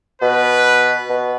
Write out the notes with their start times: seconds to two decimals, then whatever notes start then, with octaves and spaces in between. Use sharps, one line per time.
0.22 B2 B4
1.10 B2